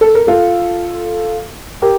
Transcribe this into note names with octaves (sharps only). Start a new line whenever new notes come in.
A4
A#4
F4 A4
G4 A#4